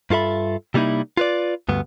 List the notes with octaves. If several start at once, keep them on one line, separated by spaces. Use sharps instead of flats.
G2 F4 A4 E5 B5
C3 G3 A#3 D#4 E4
F4 B4 D5
D2 G2 B3